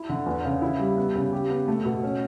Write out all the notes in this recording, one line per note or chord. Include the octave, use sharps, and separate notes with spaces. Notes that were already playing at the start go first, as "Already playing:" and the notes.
Already playing: E4
D3
E2
C#3
E4
G3
B3
C#3
G4
B3
A3
B2
C#4